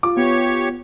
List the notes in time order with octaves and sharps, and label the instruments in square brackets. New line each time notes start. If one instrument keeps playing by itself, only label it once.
[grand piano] F4 [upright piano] D6
[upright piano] B3 [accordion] G4 C#5 C#6